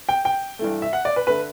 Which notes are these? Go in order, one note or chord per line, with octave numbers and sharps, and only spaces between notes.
G5
G5
G2 E3 A3
E5
F#5
D5
B4
D3 A3 B4